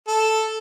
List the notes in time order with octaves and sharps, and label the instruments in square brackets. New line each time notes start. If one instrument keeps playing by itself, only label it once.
[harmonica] A4